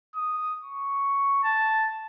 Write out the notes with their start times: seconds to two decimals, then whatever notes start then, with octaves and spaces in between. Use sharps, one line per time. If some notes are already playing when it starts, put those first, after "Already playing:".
0.16 D#6
0.62 C#6
1.44 A5